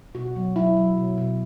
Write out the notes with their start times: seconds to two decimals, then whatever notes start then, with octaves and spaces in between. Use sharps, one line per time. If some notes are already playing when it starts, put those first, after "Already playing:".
0.15 B2 F#4
0.36 F#3
0.56 F#3 E4
0.77 F#3
0.97 B2
1.18 B2